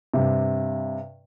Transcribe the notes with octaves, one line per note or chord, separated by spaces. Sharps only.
G2 C3